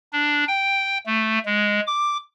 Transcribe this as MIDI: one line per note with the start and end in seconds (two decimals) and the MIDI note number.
0.13 0.45 62
0.48 0.98 79
1.06 1.39 57
1.46 1.80 56
1.87 2.17 86